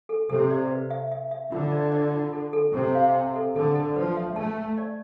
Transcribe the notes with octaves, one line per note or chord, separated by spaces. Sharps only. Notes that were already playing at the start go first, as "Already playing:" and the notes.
A4
C3 A4
D5
B4
E5
E5
E5
D3 F4
D5
D5
F4
A4
A4
C3 A4
F5
G5
A4
D3 A4
A4
F3 B4
E5
A3 A5
A5
D5